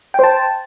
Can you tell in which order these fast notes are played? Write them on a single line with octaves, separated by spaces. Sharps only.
G5 C5 A5